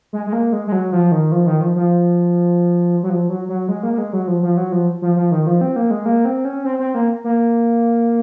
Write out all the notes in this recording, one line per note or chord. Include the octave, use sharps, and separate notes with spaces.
G#3
G#3
A#3
G#3
G#3
F#3
F3
D#3
F3
D#3
F3
F3
F#3
F3
F#3
F#3
G#3
A#3
A#3
G#3
F#3
F3
F3
F#3
F3
F3
F3
D#3
F3
C4
A#3
G#3
A#3
C4
C#4
C4
C4
A#3
A#3